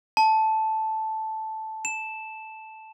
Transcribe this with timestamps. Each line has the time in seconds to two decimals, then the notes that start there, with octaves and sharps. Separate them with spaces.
0.17 A5
1.85 E7